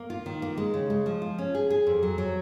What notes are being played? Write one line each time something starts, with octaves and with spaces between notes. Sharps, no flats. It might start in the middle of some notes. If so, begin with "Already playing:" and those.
Already playing: A#3
F4
D#3
A#3
G#3
C#3
G#3
F3
F4
C#4
G#4
G#4
F2
F#3
F#3